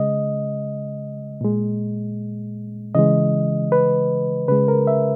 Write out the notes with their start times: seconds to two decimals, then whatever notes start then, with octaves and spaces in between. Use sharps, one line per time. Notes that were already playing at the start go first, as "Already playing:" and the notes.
Already playing: C#3 G#3 D#5
1.41 A#2 G#3
2.95 C#3 E3 G#3 D#5
3.72 B4
4.48 C#3 G#3 B4
4.68 A#4
4.87 E5